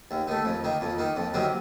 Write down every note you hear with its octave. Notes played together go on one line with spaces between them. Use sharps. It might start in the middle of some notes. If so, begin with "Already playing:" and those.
D#2
D#3 A3
F2
D#3 A#3
F2
D#3 A#3
F2
C3 D#3 F#3 A#3